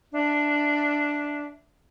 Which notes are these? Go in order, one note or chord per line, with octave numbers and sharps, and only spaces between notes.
D4 E5